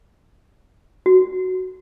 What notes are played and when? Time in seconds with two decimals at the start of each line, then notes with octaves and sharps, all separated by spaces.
1.06 F#4